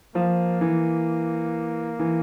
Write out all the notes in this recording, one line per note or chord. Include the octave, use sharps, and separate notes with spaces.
F3 A#3
E3
E3